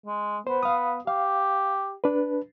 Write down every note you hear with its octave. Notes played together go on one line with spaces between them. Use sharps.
G#3
B3 C5
F5 D#6
G4 F5
D4 B4